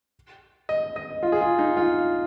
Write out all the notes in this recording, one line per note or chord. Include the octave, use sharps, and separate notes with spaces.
D#5
D#5
F4
G#4
F4
D#4
F4